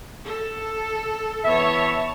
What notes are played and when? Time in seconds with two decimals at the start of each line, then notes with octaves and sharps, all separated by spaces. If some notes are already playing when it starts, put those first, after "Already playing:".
0.25 A4
1.45 E3 B3 C#5 E5 A5